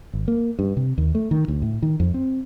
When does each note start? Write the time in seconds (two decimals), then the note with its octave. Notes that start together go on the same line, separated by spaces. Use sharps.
0.13 G#1
0.28 A#3
0.59 G2
0.77 C3
0.98 D#2
1.15 A3
1.31 D#3
1.48 D2
1.62 A2
1.82 D#3
2.00 F2
2.14 C4